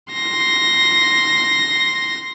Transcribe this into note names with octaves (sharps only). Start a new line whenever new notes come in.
C6 A#6